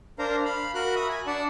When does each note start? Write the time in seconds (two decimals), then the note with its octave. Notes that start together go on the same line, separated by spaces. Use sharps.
0.19 D4 A#4 C5 F5 A#5
0.45 F5 B5
0.75 F#4 A#4 B5 F#6
0.96 E5 B5 D#6
1.09 G#5
1.27 D4 D5 F#5 A5